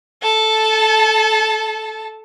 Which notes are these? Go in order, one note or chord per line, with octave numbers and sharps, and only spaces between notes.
A4 A5